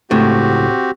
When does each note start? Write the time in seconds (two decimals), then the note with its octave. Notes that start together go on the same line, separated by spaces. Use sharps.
0.11 C#2 A2 C4 F#4 G4